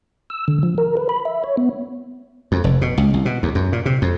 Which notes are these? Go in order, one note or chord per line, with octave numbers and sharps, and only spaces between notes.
E6
D3
F3
A#4
B4
B5
E5
C#5
B3
F2
F1
B2
C#2
C2
B2
D#2
F#2
A#2
C3
F2